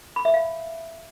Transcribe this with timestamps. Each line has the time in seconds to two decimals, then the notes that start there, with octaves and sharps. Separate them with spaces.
0.16 B5
0.25 E5
0.34 F5